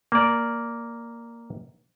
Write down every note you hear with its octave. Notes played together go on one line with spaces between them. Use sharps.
A#3 D5